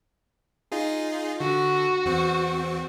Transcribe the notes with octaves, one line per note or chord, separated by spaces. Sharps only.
D#4 F4 G#4
D3 F#4
E2 C4